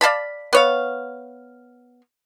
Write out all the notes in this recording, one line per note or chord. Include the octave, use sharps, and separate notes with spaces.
D5 F5 A5 B5
B3 C#5 F5